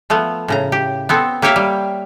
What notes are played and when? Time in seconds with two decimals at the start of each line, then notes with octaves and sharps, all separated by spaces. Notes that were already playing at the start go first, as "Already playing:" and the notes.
0.10 F3 A3 B3
0.48 A2 C#3 A#5
0.72 G4
1.09 B3 C4 A4
1.42 A#3 G4 C#5 E5 F5 G5
1.56 G3